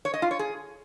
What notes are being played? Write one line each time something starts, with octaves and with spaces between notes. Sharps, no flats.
C#5
D#5
F4
C#5
G#4